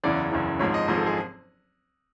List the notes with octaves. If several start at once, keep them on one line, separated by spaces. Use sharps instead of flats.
F#1 E2 C#3 E3 D5
F#1 E2 C#3 E3
G#1 G#2 F3 G#3 C#5
D#5
G#1 G#2 F3 G#3 D#5
A4
G#4